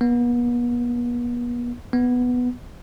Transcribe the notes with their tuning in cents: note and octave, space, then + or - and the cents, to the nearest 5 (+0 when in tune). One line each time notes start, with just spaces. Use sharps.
B3 -40
B3 +0